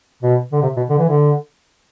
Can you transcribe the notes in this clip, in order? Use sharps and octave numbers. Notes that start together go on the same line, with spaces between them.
B2
D3
C3
B2
D3
E3
D3